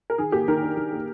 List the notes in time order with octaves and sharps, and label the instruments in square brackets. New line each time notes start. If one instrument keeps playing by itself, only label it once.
[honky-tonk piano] A#4
[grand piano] D#3 [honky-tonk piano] G#4
[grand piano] A#3 [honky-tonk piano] G4
[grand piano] D#3 [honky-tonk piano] A#4
[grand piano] D4
D#3
A#3